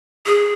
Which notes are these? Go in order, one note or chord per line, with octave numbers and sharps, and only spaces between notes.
G#4